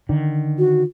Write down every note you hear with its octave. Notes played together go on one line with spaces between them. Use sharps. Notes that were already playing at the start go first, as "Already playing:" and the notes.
D3 D#3
F#4